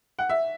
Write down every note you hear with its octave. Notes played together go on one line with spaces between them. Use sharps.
F#5
E5